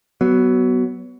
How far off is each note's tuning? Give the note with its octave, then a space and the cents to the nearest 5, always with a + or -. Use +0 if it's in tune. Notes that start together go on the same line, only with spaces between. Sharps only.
F#3 +20 B3 +0